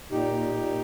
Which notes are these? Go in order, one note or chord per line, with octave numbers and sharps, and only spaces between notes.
A#2 D#4 G4
A#2
A#2